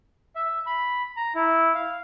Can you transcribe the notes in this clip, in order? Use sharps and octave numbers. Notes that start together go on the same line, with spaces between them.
E5
B5
A#5
E4
F5